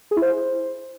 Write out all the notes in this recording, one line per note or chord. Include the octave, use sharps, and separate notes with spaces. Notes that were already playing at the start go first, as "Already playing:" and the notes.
G#4
E4
C5